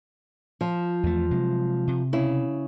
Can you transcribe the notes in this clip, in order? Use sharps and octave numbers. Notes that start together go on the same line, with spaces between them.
F3
E2 A3
C3 F#3 G#3
C3
C#3 E4